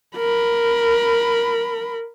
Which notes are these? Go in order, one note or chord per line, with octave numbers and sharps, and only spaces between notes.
A#4 B5